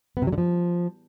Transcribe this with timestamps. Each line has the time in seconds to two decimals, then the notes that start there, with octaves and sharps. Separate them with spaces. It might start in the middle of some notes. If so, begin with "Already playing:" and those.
0.17 B3
0.22 C3
0.27 F#3
0.32 D3
0.38 F3